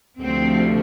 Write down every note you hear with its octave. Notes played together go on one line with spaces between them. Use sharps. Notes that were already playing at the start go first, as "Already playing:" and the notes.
D2 C3 F3 A3 C4